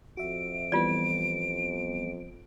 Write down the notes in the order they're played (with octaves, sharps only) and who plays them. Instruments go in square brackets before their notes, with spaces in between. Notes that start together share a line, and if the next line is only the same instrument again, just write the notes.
[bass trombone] F2 [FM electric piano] F#4 E5 [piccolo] D7
[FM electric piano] E3 G3 B3 [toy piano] F4 D5